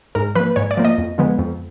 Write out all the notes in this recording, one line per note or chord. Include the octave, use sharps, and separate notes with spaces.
G#2 A#4
F3 A#3 B4
G#2 C#5
D5
F3 A#3
D#5
F2
D3 F3 G#3 B3
F2